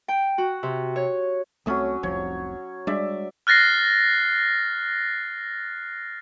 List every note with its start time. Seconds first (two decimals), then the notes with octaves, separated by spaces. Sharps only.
0.08 G5
0.38 F#4
0.63 C3
0.96 C#5
1.66 C2 F#3 A3 C4 C#4 D#6
2.03 F1 C2 F3 C#5
2.87 G3 G#3 D4 D5 E5
3.47 F6 F#6 A6 A#6 C7